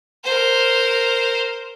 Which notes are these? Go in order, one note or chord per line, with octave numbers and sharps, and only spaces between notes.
A#4 C5